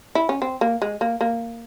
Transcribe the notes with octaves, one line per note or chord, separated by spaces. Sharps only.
E4
C#4
C4
A#3
G#3
A#3
A#3